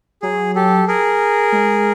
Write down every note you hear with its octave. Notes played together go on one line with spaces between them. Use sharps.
F#3 G#4
G4 A4
G#4 A#4
G#3